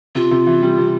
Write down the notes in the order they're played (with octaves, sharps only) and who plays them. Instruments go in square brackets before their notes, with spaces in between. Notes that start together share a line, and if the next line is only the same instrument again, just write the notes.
[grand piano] C3 [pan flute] F4
[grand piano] C3
E3
G3
C3